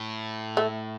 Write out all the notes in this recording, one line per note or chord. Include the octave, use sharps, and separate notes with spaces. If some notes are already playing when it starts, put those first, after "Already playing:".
Already playing: A2
A3